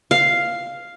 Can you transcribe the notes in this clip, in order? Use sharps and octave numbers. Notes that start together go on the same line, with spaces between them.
F5